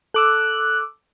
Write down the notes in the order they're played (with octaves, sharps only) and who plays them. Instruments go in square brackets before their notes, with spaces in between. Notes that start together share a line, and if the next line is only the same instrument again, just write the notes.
[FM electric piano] A4 D6 E6 [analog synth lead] F#6